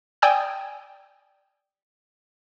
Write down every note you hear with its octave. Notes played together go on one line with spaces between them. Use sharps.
D5 G5 G#5 D#6 E6